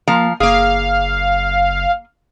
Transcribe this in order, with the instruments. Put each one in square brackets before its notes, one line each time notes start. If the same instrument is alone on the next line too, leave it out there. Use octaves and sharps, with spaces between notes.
[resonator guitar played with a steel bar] F3 F5 A#5 [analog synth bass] A#3
[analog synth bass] F#1 [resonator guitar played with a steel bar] A#3 G#4 [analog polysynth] F5